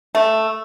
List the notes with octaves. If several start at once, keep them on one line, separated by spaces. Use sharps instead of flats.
A3